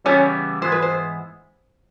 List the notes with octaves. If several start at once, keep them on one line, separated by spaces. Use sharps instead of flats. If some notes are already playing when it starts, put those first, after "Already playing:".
C#3 E3 G3 B3 C#4 E4 C#5
G#2 E3 G#3 B3 E4 C5
B4
C5